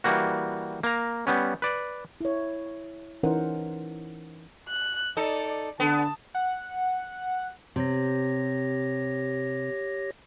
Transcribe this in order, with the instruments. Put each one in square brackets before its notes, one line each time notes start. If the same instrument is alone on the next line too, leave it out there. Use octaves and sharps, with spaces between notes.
[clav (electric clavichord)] E3 G3 A#3 F#4
A#3 A#5
G3 B3 C#4
B4 D5
[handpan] E4 C#5
E3 C#4 D#4 A#4 C5 F#5
[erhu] F#6
[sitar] D#4 A4 [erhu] D5
[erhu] D5
[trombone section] D3 [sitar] B3 [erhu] A5
[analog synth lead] F#5
[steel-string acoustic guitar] C3 [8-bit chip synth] G4 C#5 A#6